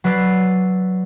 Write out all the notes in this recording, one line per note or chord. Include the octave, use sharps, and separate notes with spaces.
F#3 B4 D5 E6 C7